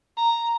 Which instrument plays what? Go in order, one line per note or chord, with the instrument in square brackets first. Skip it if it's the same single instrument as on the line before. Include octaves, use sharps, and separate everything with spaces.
[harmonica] A#5